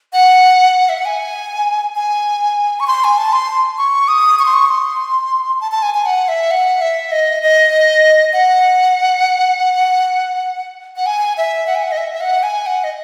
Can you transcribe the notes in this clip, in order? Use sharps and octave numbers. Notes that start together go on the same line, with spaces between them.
F#5
E5
F#5
G#5
G#5
C#6
C6
G#5
A5
C6
C#6
D#6
C#6
C6
C#6
C6
A5
A5
G#5
G#5
F#5
E5
F#5
E5
D#5
D#5
F#5
F#5
G#5
E5
F#5
G#5
F#5
D#5
E5
E5
F#5
G#5
F#5
D#5